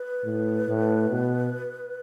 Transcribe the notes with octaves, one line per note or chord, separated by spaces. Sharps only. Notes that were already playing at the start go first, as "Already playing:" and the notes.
Already playing: B4
A2
A2
B2